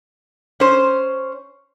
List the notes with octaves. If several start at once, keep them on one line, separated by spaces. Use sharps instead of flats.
C#4 C5